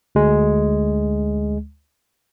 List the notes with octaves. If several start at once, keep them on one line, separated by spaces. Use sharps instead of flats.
D2 G#3